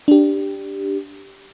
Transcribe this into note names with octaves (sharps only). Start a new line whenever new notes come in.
D4 G4